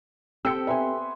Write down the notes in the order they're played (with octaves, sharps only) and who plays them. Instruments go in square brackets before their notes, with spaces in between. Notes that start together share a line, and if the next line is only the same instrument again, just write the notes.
[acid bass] C4 [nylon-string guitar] G4 A4 G5 [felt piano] E6 C#7
[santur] B3 C5 C6 [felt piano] E5 G#5